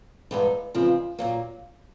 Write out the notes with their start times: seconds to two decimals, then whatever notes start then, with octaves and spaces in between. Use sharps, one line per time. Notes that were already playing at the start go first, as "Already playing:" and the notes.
0.31 G2 E3 G#3 B3 D#4
0.74 E2 C#3 F3 G#3 C4
1.19 A#2 F#3 A#3